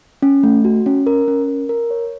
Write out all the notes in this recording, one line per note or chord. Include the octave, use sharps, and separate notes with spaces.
C#4
A3
F#4
C#4
A#4
C#4
A#4
A#4
C#5